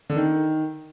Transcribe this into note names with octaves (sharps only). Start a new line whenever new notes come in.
D3
D#3